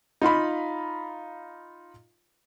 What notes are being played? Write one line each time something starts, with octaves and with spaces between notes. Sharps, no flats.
D#4 F4 F5 B5